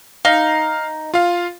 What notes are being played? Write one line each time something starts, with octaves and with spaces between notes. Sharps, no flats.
D#4 F5
F4 F5